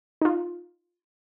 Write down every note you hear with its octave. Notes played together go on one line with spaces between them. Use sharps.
D#4 F4